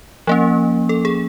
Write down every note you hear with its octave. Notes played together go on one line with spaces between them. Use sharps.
F3 A#3 C#4
A4
G#4